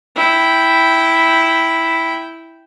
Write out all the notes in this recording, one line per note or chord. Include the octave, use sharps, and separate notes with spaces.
E4 G5